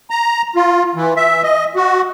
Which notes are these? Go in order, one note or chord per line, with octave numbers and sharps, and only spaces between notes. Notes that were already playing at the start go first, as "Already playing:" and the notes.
A#5
F4
E3
E5
D#5
F#4